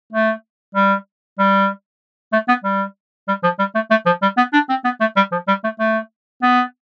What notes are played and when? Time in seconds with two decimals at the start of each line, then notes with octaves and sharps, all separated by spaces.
0.13 A3
0.75 G3
1.39 G3
2.33 A3
2.48 B3
2.64 G3
3.28 G3
3.43 F3
3.59 G3
3.75 A3
3.91 A3
4.06 F3
4.22 G3
4.37 B3
4.53 D4
4.69 C4
4.85 B3
5.00 A3
5.16 G3
5.32 F3
5.48 G3
5.64 A3
5.80 A3
6.42 B3